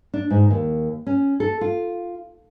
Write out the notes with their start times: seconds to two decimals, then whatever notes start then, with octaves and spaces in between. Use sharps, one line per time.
0.14 D4
0.30 G#2
0.51 D#2
1.07 C#4
1.40 A4
1.61 F4